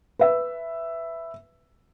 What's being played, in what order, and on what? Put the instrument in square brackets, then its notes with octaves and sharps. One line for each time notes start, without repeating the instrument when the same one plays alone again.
[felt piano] B4 E5